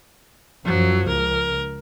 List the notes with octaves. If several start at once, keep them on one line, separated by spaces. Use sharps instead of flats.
F#2 F3 F#3
C#2 A#4